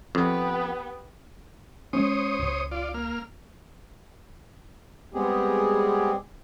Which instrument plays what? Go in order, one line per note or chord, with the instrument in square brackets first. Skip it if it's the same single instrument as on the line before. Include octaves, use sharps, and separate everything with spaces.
[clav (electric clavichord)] F2 [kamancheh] B3 G4
[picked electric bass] G#3 A#3 C#4 [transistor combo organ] C5 C#5 D#6
[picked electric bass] C#2 F#2
[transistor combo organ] F4 D5
A#3 F6
[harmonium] G3 G#3 B3 C4 G4 G#4